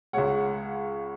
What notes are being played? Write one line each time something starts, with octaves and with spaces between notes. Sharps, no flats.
C#2 C#3 G#3 C#5 F#5